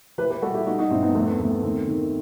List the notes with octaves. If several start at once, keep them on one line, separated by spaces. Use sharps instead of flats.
E3 G4 B4
G4 B4
G3 F#4 A4
E4 G4
G3 D#4 F#4
D#4 F#4
G2 C4 E4
B3 D#4
E2 A3 C4
B3
E2 A3
B3
D#3 A3 C4
D#3